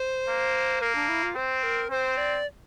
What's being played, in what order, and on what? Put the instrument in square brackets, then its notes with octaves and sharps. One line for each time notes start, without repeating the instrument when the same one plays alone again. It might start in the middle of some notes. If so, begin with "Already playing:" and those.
Already playing: [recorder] C5
[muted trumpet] A#3
[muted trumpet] A#3 [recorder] A#4
[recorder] D4
E4
F4
[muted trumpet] C4 [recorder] C5
[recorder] A#4
[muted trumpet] C4 [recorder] C5
[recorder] D5